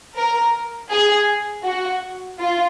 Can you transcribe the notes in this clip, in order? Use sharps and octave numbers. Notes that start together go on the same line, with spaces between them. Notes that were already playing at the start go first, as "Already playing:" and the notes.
A#4
G#4
F#4
F4